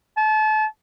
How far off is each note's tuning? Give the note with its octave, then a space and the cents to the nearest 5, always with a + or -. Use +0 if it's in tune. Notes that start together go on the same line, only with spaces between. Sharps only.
A5 -30